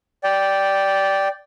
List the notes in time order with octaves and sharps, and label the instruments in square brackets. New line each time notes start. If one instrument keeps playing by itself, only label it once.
[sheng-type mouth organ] D5 G5